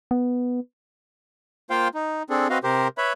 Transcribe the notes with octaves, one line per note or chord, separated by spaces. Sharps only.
B3
A#3 F4 C5 F5 G5
D#4
C4 D4 G#4 A4
C4 F#4 B4 D#5 F5
C3 G4 A#4 C5
B4 C#5 E5 B5